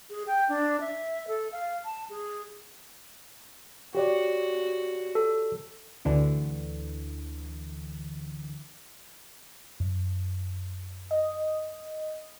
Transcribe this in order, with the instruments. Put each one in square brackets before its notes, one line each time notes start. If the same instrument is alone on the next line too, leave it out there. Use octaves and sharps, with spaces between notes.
[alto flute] G#4
G5
D4
E5
A4
F5
A5
G#4
[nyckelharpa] F#4 [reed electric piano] G4 C#5 D5
[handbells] A4
[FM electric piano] D2 D3 E3
[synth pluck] F#2
D#5